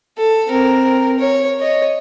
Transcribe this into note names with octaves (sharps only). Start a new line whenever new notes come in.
A4
C4 A#4
C#5
C#5 D#5